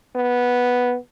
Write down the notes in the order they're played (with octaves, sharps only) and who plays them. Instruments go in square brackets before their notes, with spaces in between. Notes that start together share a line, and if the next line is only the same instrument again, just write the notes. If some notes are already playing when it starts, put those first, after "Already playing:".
[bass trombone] B3